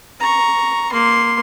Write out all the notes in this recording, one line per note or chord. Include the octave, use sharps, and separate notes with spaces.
A#5 C#6
A#3 C6